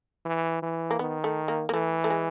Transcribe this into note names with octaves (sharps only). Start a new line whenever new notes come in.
E3
E3
A#3
D#3 B3
A3
A#3
A#3
E3 A3
A3
G#3